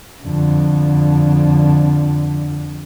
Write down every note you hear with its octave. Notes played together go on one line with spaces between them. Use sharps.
F2 D3